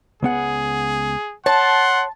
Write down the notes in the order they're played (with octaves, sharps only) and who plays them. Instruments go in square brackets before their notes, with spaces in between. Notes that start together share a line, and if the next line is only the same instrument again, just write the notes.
[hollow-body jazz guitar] C#2 B3 F#5 [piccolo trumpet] G#4
[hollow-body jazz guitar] C#5 [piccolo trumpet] F#5 [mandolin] A5 [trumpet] C6